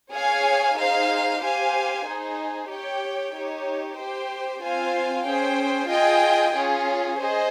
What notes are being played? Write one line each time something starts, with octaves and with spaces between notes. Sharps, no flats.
G#4 C#5 F5 G#5
D#4 G#4 C5 F5
G4 C5 F5 G#5
D#4 G#4 C5
G4 C#5 G5
D#4 G4 C#5
G4 C5 G5
C4 F4 C5 F5 G#5
C#4 G#4 C5 G5
F4 G#4 D#5 G5
C#4 F4 G#4
G#4 C5 D#5